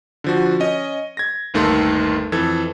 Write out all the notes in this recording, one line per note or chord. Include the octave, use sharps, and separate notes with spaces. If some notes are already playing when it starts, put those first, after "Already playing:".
D3 F3 F#4
C#4 D#5
G#6 A#6
G1 D#2 D#3 A3 A4 C6
F2 E3 A4 G#6